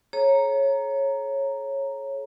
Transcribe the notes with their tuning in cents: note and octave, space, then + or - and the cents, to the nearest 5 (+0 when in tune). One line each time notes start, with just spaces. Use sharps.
G#4 +45 C#5 -15 A#5 -5